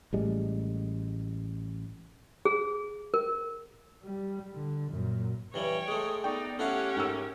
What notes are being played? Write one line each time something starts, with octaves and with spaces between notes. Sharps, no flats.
A1 A2 G3 G#3
G#4
A#4
G3
D3
F#2 A#2
G2 E3 G3 C#5 G5
G#3 A3 D#6
B3 D#4 D5 G5 C#6
A3 C#4 E4 G4 F5 F#5
G#2 A#4 E6